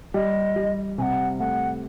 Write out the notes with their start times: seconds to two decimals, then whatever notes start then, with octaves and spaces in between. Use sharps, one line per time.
0.14 G3 D#5
0.56 G3
0.98 C3 G#5
1.02 F#5
1.40 A3 F#5